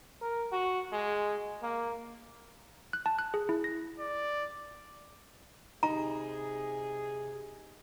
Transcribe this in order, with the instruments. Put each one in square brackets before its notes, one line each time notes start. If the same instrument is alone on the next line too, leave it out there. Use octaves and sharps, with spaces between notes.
[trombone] A#4
F#4
G#3
A#3
[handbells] F#6
A5
F#6
G#4
E4
A#6
[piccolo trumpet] D5
[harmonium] C3 [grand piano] D#4 [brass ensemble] G#4 [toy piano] A#5